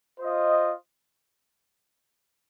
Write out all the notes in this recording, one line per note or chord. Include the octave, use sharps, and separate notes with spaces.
F4 C5 D#5